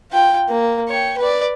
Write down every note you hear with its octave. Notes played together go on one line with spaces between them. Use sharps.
F4 G5
A#3
C#5 G5
B4 D5